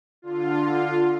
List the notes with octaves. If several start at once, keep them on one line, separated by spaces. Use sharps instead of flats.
D3 F4